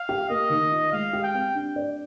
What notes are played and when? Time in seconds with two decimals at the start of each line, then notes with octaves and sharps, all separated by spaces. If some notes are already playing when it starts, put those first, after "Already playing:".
Already playing: F5
0.09 G4
0.29 A#3 D#5
0.50 D#3
0.71 F4
0.92 G#3 F5
1.13 G4
1.24 G5
1.34 C4
1.55 D4
1.76 D5